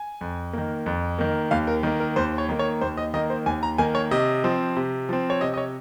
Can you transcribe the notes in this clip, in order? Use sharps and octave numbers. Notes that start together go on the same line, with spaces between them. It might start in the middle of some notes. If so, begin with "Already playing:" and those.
Already playing: G#5
F2
D#3 A#3
F2
D#3 A#3
D#2 F5
A#4
D#3 A#3
A#4
D#2 C5
C#5
D#3 A#3
C#5
D#2 C5
D#5
D#3 A#3 D#5
C5
D#2 G#5
A#5
D#3 A#3 G#5
C#5
C3 D#5
F3 C4
C3
F3 C4
C#5
C3 D#5
D#5
C#5